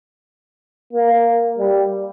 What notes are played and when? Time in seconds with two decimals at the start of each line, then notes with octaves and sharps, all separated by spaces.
0.93 A#3
1.59 G3